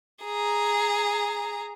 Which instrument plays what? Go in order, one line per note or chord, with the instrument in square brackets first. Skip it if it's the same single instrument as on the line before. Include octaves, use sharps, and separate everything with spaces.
[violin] G#4 A#5